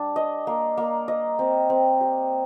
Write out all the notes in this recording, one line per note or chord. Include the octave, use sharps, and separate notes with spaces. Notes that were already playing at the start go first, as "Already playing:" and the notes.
Already playing: G3 D4
D#5
A#3
A#3
D#5
C4
C4
G4